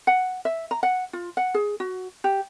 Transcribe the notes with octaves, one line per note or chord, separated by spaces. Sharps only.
F#5
E5
A#5
F#5
F4
F#5
G#4
F#4
G4